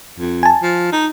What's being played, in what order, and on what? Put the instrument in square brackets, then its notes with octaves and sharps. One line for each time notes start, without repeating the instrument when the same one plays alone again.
[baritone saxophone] F2
[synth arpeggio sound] G#5 A5
[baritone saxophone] F3
D#4